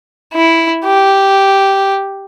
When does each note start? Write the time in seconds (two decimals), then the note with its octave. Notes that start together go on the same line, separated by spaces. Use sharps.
0.34 E4
0.85 G4